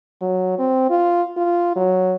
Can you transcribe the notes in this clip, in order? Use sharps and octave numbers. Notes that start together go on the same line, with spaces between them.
F#3
C4
F4
F4
F#3